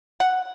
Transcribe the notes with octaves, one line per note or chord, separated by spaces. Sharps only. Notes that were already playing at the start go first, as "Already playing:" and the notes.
F#5